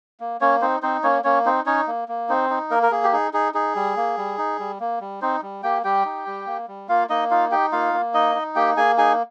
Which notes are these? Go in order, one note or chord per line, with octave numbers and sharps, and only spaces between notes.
A#3
A#3 C#4 C#5
C4 D#4 C5
C4 D#4 C5
A#3 C#4 C#5
A#3 C#4 C#5
C4 D#4 C5
C#4 D#4 C#5
A#3
A#3
C4 D#4 C5
D#4
A#3 A#4
A#4
A#3 G#4
G4
D#4 G#4
D#4 G#4
D#4 G#4
G3
A#3
G3
D#4
G3
A#3
G3
C4 D#4 C5
G3
A#3 G4 G5
G3 G4 G5
D#4
G3
A#3
G3
A#3 F4 F5
A#3 D#4 D#5
D#4 F4 F5
D#4 G4 G5
A#3 F4 F5
A#3
D#4 D#5
D#4
A#3 G4 G5
A#3 G#4 G#5
D#4 G#4 G#5